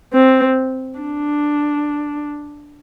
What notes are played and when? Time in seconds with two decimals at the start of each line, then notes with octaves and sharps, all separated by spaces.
0.13 C4
0.99 D4